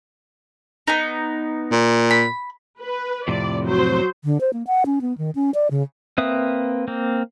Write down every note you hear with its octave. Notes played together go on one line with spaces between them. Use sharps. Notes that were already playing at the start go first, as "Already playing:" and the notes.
B3 D#4
A#2
B5
B4
F2 A2 C3 D5
F#3 C5
D3
C5
A#3
F#5
C#4
B3
D#3
C#4
D5
C#3
A#3 C4 B4 E5 D#6
A#3 C4